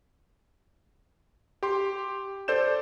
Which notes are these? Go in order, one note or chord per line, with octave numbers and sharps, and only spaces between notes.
G4 C6
A4 C5 D5 G6 E7